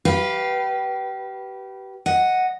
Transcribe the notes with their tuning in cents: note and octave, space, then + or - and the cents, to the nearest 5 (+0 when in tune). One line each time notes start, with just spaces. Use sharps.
G4 -30 B4 -10 F5 +0
D#5 +0 F#5 +0